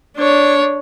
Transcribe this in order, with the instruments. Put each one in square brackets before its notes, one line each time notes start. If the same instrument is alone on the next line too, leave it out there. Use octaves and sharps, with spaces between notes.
[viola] D4 C#5